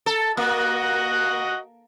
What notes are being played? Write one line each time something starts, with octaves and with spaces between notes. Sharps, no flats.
A4
A#3 F#4 D#5 F#5